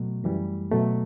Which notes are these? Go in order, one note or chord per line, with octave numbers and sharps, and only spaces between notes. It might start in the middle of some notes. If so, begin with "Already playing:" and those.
Already playing: B2 F#3 A3
F#2 E3 G3
B2 F#3 A3